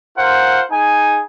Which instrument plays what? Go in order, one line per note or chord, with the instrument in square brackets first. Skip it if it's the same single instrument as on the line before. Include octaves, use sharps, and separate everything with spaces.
[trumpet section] F4 A#4 C5 F#5
D#4 G#4 G#5